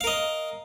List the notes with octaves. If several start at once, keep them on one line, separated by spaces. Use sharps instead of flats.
A#4 D#5 F5